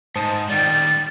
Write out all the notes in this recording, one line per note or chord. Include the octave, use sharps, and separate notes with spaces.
G#2 C5 A5 D#6
D#3 G3 D5 G5 A6